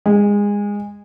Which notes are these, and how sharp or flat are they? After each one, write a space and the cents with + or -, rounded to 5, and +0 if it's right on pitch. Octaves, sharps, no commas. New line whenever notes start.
G#3 -25